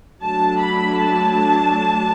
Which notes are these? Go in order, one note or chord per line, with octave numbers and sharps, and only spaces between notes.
F#3 A3 D4 A5
B5
A5